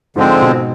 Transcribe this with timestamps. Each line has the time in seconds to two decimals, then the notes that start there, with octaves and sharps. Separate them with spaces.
0.16 G#2 D3 F3 G#3 C4
0.42 B2